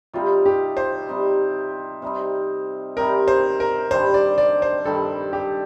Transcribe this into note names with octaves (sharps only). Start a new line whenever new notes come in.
C3 G3 C4 D#4 F4
G4
C5
C3 G3 C4 D#4
C3 G3 C4 D#4
C3 G3 C4 D#4 A#4
C5
A#4
G2 D#3 G3 D4 C5
D5
D5
C5
G2 D#3 G3 D4 A4
G4